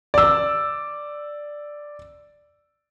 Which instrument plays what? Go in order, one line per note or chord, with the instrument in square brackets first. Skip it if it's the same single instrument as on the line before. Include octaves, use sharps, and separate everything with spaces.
[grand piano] D5 E6